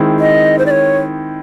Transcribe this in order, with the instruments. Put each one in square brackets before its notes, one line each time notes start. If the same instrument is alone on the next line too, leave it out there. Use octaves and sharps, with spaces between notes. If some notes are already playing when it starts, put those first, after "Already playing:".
Already playing: [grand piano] D#3 G#3 C4 E4
[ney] D#5
C5
D5
C#5